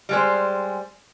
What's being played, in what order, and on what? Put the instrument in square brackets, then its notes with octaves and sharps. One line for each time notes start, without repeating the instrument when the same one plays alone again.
[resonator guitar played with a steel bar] G3 G#3 C5